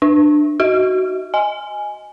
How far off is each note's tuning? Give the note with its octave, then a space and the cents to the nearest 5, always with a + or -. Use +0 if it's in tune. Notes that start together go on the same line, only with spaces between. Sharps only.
D4 +20 E5 +0
D#4 -5 F#4 +15 E5 +0
D#5 +0 G#5 +0